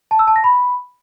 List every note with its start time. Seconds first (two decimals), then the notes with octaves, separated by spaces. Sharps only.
0.11 A5
0.19 E6
0.27 A5
0.36 A#6
0.44 B5